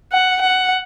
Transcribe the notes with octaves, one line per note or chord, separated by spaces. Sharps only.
F#5
F#5